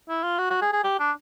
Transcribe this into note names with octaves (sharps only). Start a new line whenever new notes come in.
E4
F4
F#4
F#4
G#4
G#4
G4
D4